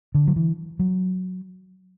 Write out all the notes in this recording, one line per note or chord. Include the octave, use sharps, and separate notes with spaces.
D3
F#3
E3
F#3